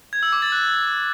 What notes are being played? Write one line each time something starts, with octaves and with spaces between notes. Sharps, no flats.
G#6
E6
D6
A6
F#6